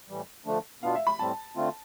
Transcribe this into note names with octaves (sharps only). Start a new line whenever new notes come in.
A2 E3 G3
D3 F3 A3 D4
B2 B3 D4 F4 F5
E5
B5
A2 G3 C4 A5
D3 A3 C4 F4